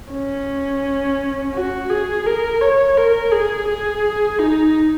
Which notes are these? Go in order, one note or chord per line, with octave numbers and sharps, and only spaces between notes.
C#4
F#4
G#4
A#4
C#5
A#4
G#4
G#4
D#4